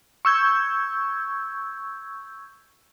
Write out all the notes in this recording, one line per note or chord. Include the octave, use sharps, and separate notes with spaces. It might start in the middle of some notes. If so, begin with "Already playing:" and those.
C#6 E6 G6 G#6